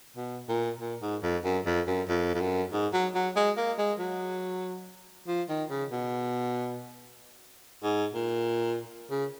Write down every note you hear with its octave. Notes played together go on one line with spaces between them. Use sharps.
B2
A#2
A#2
G#2
F2
F#2
F2
F#2
F2
F2
F#2
G#2
F#3
F#3
G#3
A#3
G#3
F#3
F3
D#3
C#3
B2
G#2
A#2
C#3